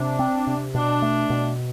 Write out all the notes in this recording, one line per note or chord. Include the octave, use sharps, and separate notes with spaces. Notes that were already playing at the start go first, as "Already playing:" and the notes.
Already playing: C3 D4
C4
C3
B2 D4
A3
B2